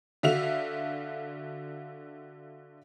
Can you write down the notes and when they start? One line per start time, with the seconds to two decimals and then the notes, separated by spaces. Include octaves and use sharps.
0.23 D3 F#4 E5 F5 F7